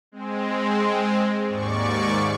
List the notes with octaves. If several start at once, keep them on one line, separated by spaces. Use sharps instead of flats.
G#3 C4
D#2 G#2 D5 C#6